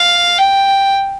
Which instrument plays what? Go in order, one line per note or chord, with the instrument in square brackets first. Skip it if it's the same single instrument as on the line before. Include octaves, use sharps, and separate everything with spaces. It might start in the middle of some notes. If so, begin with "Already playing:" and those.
Already playing: [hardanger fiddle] F5
G5